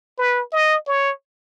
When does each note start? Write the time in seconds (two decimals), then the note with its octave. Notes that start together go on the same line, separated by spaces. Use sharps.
0.18 B4
0.53 D#5
0.87 C#5